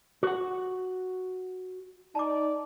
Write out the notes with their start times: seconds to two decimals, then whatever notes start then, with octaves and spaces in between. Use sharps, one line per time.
0.23 F#4 F#5
2.15 D#4 D5 A5 A#5 D6